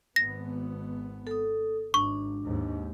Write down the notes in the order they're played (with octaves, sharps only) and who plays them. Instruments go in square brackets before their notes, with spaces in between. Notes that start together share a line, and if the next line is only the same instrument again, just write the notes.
[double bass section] G#1 B3 [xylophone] A#6
[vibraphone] A4 D#6
[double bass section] G#1 [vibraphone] D4 [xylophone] C#6
[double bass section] D#2 G#2